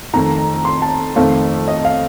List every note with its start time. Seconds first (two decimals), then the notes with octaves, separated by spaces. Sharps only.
0.13 F2 D#3 A3 A#5
0.65 C6
0.82 A5
1.16 F2 D#3 A3 C4 F5
1.68 D#5
1.85 F5